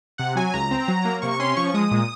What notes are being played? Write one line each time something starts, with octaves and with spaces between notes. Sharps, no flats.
C3 F#5
F#3 G#5
C#2 A#5
C4
F#3
A#3
C3 C#6
C#4 C6
F3 C#6
G#3 D#6
A#2